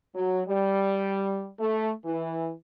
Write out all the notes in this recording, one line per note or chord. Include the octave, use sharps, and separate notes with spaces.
F#3
G3
A3
E3